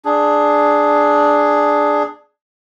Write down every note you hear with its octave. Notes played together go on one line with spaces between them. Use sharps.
D4 G#4